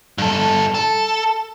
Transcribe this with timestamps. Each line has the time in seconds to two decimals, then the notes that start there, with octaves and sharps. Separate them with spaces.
0.18 G2 A4
0.75 A4